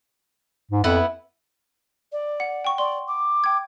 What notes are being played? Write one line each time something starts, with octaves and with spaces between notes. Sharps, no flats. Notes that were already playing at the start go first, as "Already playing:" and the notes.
G#2
F2 B3 E4 F#5
D5
F#5
G5 C#6
D5 C6
D6
G5 G#6